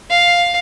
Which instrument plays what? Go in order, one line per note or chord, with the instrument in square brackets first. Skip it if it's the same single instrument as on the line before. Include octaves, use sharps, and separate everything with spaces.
[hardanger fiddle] F5